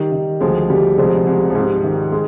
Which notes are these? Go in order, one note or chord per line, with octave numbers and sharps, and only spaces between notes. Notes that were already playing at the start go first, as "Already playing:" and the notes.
Already playing: D#3 G3
D#3
D2 F3 G#3
D2 G3
C2 F3 G#3
C2 G#3
G3
F3
G#2
G3
D#3
G#3